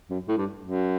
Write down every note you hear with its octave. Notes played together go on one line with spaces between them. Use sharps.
F#2
A2
G2
F#2